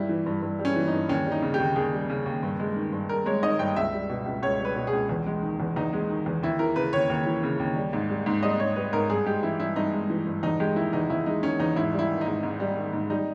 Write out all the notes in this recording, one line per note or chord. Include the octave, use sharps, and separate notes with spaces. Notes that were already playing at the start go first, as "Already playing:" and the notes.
Already playing: G2 G3 E4
E3
G2
G2
G3
C#4
E3
G2 D#4
D#2 C#4
G3
D#4
C#3
G4
D#2
D#2 G#4
G3
C#3
D#2
G2
G#3
D#3
G2
G2 A#4
G#3 C#5
D#3 D#5
G2 G5
C#2 E5
G3
B2
C#2
C#2 C#5
G3
B4
B2
G#4
C#2
E2
G#3
D#3
E2
E2 D#4
G#3
D#3
E2
D#2 E4
E3 A#4
C#3 B4
D#2 C#5
D#2
E3
C#3
D#2
G3
G#2
G3
G#2
G3 D#5
G#2 C#5
G3 B4
G#2 A#4
G2 G#4
G#3 G4
E3 E4
G2 E4
G2 D#4
G#3
E3
G2
E2 D#4
G#3 G4
D#3 E4
E2 D#4
E2 E4
G#3 D#4
D#3 C#4
E2 D#4
G#2 E4
G3
E4
D#3
D#4
G#2
G#2
G3
D#3
G#2
G3 D#4